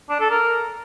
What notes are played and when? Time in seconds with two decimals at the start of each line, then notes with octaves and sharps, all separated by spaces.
0.09 D4
0.20 A4
0.31 A#4